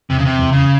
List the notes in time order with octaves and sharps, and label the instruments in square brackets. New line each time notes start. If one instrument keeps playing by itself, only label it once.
[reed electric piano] E2 [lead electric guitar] C3
[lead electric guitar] C#3
C3
[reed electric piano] E2
[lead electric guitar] C#3